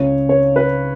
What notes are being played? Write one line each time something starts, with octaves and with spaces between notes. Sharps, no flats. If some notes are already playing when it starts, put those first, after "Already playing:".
Already playing: C#2 C#3 C#5
C#5
B4